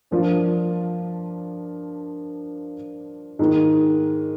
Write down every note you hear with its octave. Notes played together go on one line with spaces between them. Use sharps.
G2 F3 A#3 D4 F4
G#2 D#3 A#3